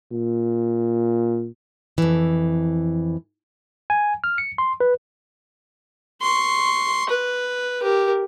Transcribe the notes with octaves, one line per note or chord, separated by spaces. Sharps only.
A#2
F2 E3
G#5
F6
C#7
C6
B4
C6 C#6
B4
G4 A#4